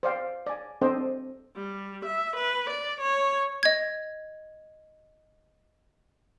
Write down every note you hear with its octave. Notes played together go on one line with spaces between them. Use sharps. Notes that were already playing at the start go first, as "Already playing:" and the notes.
C5 D5 F5 G5
D5 G#5
C4 D4 A4 C5 D#5 G5
G3
E5
B4
D5
C#5
D#5 G#6